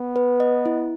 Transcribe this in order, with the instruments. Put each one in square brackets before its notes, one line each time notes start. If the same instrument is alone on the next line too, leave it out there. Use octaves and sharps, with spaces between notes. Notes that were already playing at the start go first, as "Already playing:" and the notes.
Already playing: [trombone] B3
[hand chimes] B4
D#5
E4